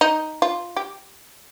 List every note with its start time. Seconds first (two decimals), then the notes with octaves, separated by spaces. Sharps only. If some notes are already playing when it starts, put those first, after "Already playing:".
0.01 D#4
0.42 F4
0.77 G4